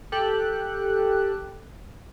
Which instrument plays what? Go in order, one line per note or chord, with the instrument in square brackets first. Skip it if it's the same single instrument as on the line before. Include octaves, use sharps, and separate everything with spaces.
[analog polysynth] G4 A4 G5 F#6